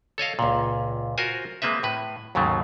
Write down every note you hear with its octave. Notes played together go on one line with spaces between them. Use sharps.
A4 C#5 D#5 F5
C#2 A#2
F4 F#4 A#4 C5 G#5
G#3 A#3 C4 B4 E5
A2 B4
D#2 G#2 C#3 F#3 A3